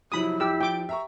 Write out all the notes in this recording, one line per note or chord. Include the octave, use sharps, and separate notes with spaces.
C3 F3 F#3 E4 B5 D#6
F2 G4 E6
F3 G5 D6
E5 A#5 C#6